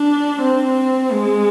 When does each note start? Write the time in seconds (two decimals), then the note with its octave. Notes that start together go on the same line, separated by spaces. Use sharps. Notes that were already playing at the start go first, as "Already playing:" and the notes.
Already playing: D4
0.42 C4
1.12 G#3